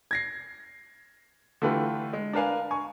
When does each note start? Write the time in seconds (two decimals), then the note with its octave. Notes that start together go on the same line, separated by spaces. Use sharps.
0.11 G#6 A#6 C7
1.62 D3 E3 A3 F4 G4 B4
2.13 G#3
2.33 D4 A#4 B4 F5 G#5
2.71 G#5 C#6